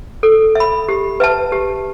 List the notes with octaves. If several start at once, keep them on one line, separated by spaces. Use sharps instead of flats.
A4
E5 B5
G4
B4 E5 A5
G4